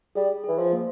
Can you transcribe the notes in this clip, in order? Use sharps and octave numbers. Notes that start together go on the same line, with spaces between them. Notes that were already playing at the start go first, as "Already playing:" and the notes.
G3 G#4
E3 G#4
F3
A#3